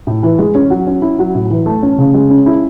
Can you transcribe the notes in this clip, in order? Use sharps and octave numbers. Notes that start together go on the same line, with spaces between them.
A2
E3
G#3
C#4
F#3
C#4
E4
F#3
A2
E3
A3
C#4
C#3
G#3
C#4
E4